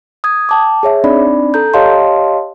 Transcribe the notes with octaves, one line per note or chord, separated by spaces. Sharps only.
D#6 G#6
G5 A5 D6
G#4 C#5 E5
C4 D4 D#4 D5 B5
A4 A#5 G6
G4 C#5 D#5 F5 A5 C6